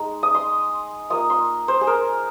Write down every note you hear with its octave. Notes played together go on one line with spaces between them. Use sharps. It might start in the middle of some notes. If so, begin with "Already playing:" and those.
Already playing: G#3 D#4
D#6
C6
A#3 F4 D#6
C6
C5
G#4
A#4